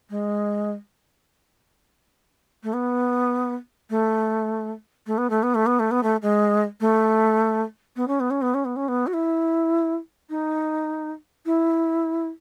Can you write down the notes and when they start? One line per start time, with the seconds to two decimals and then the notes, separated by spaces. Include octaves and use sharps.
0.10 G#3
2.63 A3
2.73 B3
3.90 A3
5.06 A3
5.17 B3
5.30 A3
5.43 B3
5.54 A3
5.66 B3
5.79 A3
5.91 B3
6.03 A3
6.22 G#3
6.80 A3
7.96 B3
8.08 C#4
8.20 B3
8.30 C#4
8.42 B3
8.54 C#4
8.65 B3
8.76 C#4
8.88 B3
9.07 F#4
9.13 E4
10.29 D#4
11.45 E4